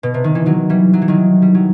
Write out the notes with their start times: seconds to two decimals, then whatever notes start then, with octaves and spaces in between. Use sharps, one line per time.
0.03 B2
0.14 C3
0.24 D#3
0.35 E3
0.46 D#3 F#3
0.70 E3 G3
0.93 F#3
1.02 E3
1.08 D#3 F#3
1.42 G3
1.54 F#3